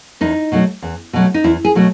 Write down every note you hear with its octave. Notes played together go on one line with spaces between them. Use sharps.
E2 D#4
B2 F#3 A3
E2
B2 F#3 A3
D#4
E2 E4
G#4
B2 F#3 A3